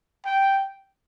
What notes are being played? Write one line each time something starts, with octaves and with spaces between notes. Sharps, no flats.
G5